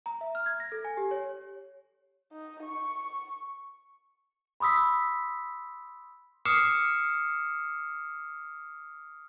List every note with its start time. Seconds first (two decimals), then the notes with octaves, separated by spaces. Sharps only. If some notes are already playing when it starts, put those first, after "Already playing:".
0.06 A#5
0.21 E5
0.35 F6
0.46 G#6
0.60 A#6
0.72 A4
0.85 G#5
0.97 G4
1.11 C#5
2.32 D#4
2.64 C#6
4.60 B5 C6 D#6 E6 B6
6.45 D6 D#6 F6 C7 C#7 E7